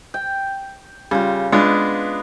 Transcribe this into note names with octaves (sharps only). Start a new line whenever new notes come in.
G5
C#3 G3 F4
G#3 B3 D4 F4